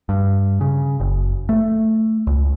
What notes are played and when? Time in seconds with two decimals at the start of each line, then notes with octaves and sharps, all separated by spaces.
0.09 G2
0.61 C#3
1.00 F#1
1.49 A3
2.27 C#2